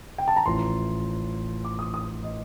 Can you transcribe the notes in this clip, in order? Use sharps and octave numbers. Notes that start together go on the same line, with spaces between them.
G5
A5
A#5
A1 A2 F3 C6
D6
D#6
D#6
D#5